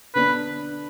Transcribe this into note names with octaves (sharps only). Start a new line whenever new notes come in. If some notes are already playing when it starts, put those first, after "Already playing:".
D3 B3 D4 B4